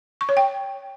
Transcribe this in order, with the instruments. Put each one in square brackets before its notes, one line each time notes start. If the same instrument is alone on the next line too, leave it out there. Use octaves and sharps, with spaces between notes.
[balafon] C#6
C#5
G5